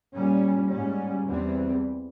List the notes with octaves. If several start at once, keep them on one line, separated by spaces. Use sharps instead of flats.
A#2 G3 C#4
G#2 G3 C#4
E2 E3 G3 C4